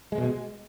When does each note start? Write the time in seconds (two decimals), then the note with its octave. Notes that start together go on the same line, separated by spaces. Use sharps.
0.12 G#3
0.18 B2
0.24 G#3